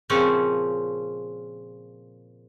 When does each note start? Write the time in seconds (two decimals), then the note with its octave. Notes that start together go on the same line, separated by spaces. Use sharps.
0.10 A#2 C#3 F3 C4 C#4 C#5